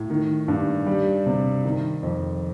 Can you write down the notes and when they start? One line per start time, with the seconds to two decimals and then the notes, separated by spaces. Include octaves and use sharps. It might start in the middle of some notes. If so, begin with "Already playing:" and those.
Already playing: A2
0.10 D#3
0.48 G2
0.87 G3
1.26 C3
1.65 D#3
2.03 F2